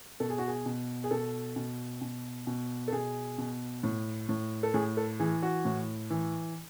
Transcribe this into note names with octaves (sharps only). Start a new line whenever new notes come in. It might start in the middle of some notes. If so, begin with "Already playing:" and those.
B2 A4
G#4
F#4
G#4
B2
G#4
B2 A4
B2
B2
B2
A4
B2 G#4
B2
A2
A2
A4
A2 G#4
A4
E3 G#4
F#4
A2
E3